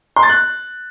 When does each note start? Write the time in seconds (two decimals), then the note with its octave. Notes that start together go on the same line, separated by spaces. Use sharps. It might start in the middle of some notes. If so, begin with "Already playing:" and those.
0.16 C6
0.23 A6
0.29 F#6